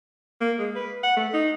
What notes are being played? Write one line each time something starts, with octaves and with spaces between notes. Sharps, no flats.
A#3
G#3
B4
F#5
A3
D#4